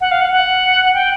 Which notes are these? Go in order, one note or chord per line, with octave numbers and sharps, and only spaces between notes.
F#5
F5
F#5
F#5
G5